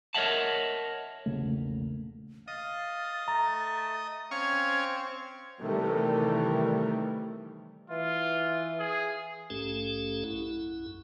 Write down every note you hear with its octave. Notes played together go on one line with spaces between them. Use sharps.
A#4 C#5 D#5 E5 F#5 A5
E1 A#1 C#3 A3
D#5 F5 A6
A3 A#5
C4 C#4 F5 C#6 G#6
C3 D#3 E3 G3 A3
E3 F4
G#4
A#1 G#2 A3 C#4 G4 A4
B1 F#2 E4